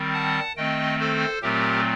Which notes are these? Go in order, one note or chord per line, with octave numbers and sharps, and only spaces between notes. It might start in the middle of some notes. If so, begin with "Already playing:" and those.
Already playing: D#3 G3 C4
F#5 A5
D#3 A3 C4 D#5 G5
A4 C5
A#2 F#3 A3 C4 G4 A#4